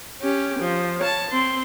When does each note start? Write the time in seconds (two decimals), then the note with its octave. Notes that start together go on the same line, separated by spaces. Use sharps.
0.22 C#4 G4
0.59 F3
0.99 C#5 A5
1.31 C4 C6